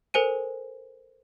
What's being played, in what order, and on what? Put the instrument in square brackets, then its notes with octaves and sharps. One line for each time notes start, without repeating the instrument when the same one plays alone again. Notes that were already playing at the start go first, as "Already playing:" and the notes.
[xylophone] A4 A#4 C5 G#5 D#7